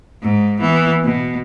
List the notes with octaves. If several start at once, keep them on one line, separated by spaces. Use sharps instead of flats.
G#2
E3 B3
B2